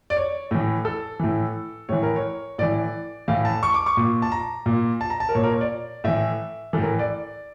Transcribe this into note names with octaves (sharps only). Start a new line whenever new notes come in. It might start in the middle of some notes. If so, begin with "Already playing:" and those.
D5
C#5
A2 E3
A4
A2 E3
A2 E3 C#5
A#4
C#5
A2 E3 D5
A2 E3 F5
A5
C#6
D6
C#6
A#2
A5
A#5
A#2
A5
A#5
A5
A#4
A#2 C#5
A#4
C#5
D5
A2 E3 E5
A2 E3 A4 A#4
D5